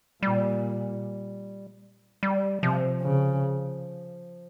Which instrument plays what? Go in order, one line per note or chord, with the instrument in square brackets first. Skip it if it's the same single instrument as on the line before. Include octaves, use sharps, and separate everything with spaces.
[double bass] A#2 [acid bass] G3
[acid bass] G3
[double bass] C3 [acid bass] F3
[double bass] C#3